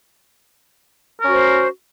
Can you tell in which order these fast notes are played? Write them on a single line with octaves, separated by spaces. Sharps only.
A#4 C#4 F#4 C5